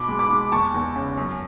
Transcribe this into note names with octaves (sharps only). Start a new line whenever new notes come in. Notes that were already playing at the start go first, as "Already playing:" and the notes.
Already playing: B2 B5 D6
G#3
B5 D6
G#3
E2 A5 C#6
E2
C#3
F#2